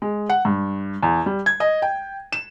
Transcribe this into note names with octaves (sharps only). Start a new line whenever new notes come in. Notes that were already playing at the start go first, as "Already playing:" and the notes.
G#3
F#5
G2
E2
G3
G#6
D#5
G5
E7